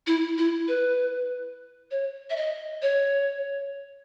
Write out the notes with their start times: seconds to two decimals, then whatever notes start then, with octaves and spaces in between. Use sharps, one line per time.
0.07 E4
0.38 E4
0.68 B4
1.91 C#5
2.30 E5
2.36 D#5
2.82 C#5